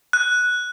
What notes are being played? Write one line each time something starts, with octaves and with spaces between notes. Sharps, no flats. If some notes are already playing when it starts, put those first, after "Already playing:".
F#6